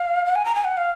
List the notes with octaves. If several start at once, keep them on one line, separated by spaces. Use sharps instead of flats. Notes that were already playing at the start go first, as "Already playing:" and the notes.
Already playing: F5
F#5
G#5
A#5
G#5
F#5
F5